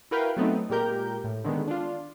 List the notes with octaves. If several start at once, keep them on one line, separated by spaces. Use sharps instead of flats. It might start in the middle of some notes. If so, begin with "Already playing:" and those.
E4 F#4 A#4 B4 F5 G5
F#3 A3 B3 C4 D#4
A#2 G#3 G4 A#4 G6
A2
D3 D#3 G#3 B3
D4 F4